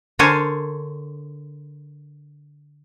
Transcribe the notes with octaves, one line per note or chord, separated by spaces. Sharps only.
D3 A#4 C5 C#5 G#5 A5